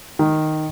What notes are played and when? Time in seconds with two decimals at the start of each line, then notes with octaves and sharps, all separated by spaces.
0.19 D#3